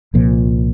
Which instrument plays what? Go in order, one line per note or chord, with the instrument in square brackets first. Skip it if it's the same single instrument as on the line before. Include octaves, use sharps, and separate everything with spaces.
[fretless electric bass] C2 A#2 F3